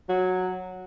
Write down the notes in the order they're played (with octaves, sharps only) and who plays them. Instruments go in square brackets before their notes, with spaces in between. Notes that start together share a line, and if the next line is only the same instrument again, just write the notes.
[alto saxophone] F#3